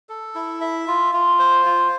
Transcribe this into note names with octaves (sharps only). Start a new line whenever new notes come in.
A4
E4
E5
F4
F4
C5
F4